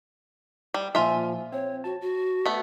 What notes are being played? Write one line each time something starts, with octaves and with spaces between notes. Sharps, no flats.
G3
A#2 F3 F4 E5 G#5
C4 C#5
F#4 A5
F#4
A3 B3